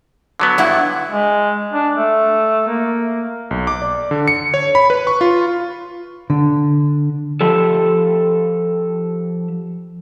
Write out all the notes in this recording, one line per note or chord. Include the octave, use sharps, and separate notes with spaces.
D3 F#3 B3
G2 E4 F#5
G#3
D4
A3
A#3
B1
D6
D5
D3
C#7
C#5
B5
B4
C#6
F4
D3
F3 G4 A4